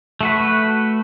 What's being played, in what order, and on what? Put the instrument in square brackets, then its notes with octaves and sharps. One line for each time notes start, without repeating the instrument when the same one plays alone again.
[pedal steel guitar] A3 F#4 B4